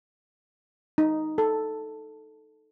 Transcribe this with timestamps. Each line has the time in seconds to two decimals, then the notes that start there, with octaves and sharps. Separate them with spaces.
0.98 D#4
1.38 A4